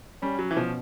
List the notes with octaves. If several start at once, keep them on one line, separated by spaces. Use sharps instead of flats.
G3 C#4
F#3
E3
B2 F3